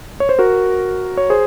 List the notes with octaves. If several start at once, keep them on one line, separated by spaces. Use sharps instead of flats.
C#5
C5
F#4 A#4
C#5
G#4 C5